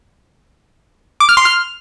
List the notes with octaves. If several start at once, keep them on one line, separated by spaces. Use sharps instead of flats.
D6
F6
C6
F6